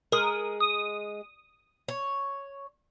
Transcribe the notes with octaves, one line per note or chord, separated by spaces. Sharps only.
G#3 A#4 D#6
D#6
C#5